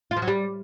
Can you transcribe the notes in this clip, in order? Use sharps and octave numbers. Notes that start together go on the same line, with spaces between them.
F4
F3
F#3
G3